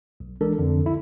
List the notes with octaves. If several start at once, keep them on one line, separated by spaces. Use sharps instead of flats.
B1
E3 G#3 D4 A4 A#4
F2 D3
C2 E4